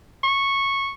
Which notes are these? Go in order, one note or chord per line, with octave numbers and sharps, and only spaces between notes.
C#6